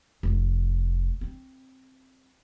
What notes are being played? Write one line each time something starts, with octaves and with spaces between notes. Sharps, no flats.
F1
C4